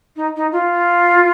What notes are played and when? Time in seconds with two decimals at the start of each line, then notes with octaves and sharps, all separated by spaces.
0.16 D#4
0.36 D#4
0.52 F4